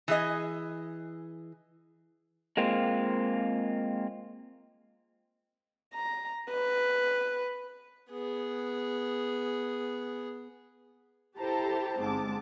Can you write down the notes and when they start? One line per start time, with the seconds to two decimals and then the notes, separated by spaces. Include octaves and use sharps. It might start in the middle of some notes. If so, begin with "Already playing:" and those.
0.08 E3 G#4 D#5
2.57 G#3 A#3 C4 F4
5.94 A#5
6.51 B4
8.11 B3 G#4
11.38 E4 G4 A4 C5 A5 A#5
12.01 G1 G#2 C4 A5 D6